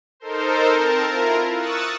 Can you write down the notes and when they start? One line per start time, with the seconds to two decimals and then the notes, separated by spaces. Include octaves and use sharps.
0.20 D#4 A4 A#4 C5
0.72 C4 A#4 A5
1.05 E4 F4 A#4
1.54 C#6 D#6 E6 F#6 A6